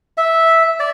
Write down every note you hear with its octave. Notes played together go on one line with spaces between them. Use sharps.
E5
D5